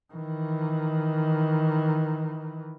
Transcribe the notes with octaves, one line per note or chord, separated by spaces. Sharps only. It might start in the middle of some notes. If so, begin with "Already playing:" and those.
D#3 E3